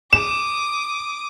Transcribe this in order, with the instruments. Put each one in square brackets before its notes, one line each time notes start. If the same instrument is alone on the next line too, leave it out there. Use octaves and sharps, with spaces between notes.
[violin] D6 D#6 [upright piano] E7